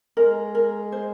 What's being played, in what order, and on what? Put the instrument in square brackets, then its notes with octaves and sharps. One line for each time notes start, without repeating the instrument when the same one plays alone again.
[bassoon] G#3 [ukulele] A#4
[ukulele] A#4
C5